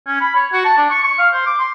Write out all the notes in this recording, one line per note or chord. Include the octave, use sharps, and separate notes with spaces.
C#4
B5
C#5
F#4
A5
D4
C#6
C#6
F5
C5
D6
C6